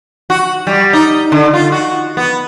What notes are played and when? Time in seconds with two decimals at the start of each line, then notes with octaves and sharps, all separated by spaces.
0.30 F#4
0.67 G3
0.93 D#4
1.32 D3
1.53 F4
1.72 F#4
2.17 B3